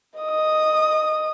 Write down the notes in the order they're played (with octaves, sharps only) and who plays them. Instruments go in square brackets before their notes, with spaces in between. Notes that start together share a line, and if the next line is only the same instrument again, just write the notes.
[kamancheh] D#5 D#6